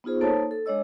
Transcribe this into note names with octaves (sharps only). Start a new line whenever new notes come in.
B3 D#4 F4 G#4 C5
A#3 D#4 A4 C5 C#5 A5
A4
G#3 D4 C#5 D#5 E6